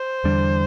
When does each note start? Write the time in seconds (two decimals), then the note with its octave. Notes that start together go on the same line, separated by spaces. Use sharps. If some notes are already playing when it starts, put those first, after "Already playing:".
Already playing: C5
0.24 E2 D3 G3 D4